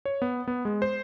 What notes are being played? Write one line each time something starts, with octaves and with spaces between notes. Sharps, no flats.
C#5
B3
B3
G#3
C5